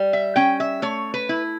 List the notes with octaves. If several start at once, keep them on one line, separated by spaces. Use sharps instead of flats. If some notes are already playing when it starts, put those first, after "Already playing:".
Already playing: G3
E5
C#4 G5
E5
A3 C#5
B4
E4